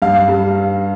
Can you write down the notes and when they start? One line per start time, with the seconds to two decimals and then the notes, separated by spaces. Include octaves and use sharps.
0.02 G2 F5
0.28 G3